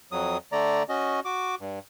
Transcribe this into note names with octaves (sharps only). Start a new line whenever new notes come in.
F2 F#3 D#6
D3 A3 D5 A#5
C#4 F#4 D#5
F#4 D6
G2